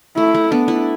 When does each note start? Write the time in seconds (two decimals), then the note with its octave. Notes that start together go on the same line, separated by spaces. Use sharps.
0.17 A3 E4
0.35 A3
0.52 B3 D4
0.68 E4